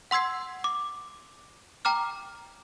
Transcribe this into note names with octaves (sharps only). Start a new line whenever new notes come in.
F#5 C6 E6 G#6 C7
D6
G5 A#5 D6 F6